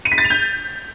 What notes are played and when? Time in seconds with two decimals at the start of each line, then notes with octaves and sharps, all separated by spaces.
0.05 D#7
0.12 B6
0.18 A6
0.24 F7
0.30 G6